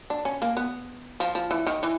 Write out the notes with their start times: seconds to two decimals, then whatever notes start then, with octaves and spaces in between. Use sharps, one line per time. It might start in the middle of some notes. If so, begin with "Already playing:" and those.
0.10 D4
0.25 C#4
0.42 A#3
0.57 B3
1.20 F3
1.35 F3
1.51 E3
1.66 D#3
1.83 E3